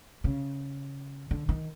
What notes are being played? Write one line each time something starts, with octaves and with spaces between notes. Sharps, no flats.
C#3
D3
D#3